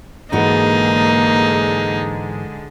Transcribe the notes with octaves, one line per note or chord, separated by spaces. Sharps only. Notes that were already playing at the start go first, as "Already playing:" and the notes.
G#2 D3 E3 G#3 A#3 D#4 F#4